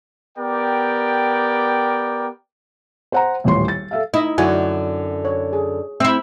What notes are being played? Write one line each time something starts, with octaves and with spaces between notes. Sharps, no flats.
B3 G4 A#4 D5 G5
C5 F#5 A#5
D#1 A1 C#5 C6
A6
A4 E5 F5
D#4 E4 D#5
F#2 D3 E4 F#4 G#5
C#5
G#4
C4 E4 E5 E6